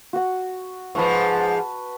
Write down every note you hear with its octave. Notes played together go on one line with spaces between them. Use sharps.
F#4 F#5
G#2 F3 B4 A5 C#6